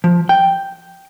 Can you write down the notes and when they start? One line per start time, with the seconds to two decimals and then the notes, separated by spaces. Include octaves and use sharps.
0.04 F3
0.29 G5